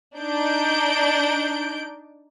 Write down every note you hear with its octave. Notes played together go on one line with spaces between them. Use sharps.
D4 D#4 G6 D7